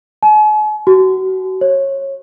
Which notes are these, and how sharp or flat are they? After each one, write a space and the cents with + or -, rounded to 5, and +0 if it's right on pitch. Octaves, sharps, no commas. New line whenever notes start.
G#5 +45
F#4 +30
C#5 -20